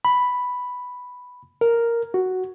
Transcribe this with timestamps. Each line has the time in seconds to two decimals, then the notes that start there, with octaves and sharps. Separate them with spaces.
0.05 B5
1.61 A#4
2.14 F#4